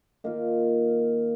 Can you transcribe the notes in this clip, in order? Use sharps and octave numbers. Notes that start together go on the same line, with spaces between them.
D#3 A#3 F4